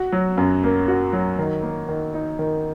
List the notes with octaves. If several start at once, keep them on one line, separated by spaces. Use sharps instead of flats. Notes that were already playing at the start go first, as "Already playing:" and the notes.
Already playing: F#4
F#3
F#2
A#3
F#4
F#3
D#3
A#3
D#3
D#4
D#3